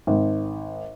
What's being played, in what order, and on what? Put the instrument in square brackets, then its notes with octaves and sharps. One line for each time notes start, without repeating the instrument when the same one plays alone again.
[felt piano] G#1